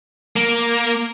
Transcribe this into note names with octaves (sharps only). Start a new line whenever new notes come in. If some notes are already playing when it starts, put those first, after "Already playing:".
A#3